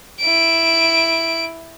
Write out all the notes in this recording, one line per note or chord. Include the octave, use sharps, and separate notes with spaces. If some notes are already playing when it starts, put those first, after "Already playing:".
E4 D7